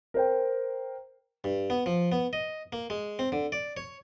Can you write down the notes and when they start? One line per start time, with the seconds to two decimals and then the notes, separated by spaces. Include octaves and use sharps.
0.14 A#4 C5 G5
1.44 G2
1.70 B3
1.86 F3
2.12 B3
2.33 D#5
2.73 A#3
2.90 G#3
3.19 C4
3.32 D3
3.52 D5
3.77 C#5